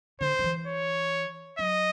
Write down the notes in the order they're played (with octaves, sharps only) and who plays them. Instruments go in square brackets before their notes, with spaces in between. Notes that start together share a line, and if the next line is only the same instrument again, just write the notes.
[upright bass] D3 [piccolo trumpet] C5
[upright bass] D#3
E3
[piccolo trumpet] C#5
[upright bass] F#3 [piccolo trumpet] D#5